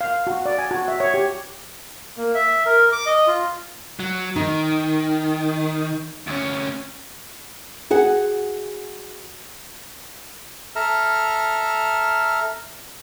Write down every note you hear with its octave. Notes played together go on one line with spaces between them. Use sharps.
F5
F#4
D5
G#5
F#4
E5
C#5
G4
A#3
E5
A#4
D6
D#5
F4
F#3
D#3 D#4
D2 C#4
F#4 G#4 F#5
A4 E5 A#5 F6